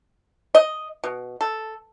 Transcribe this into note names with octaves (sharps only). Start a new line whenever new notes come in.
D#5
B2
A4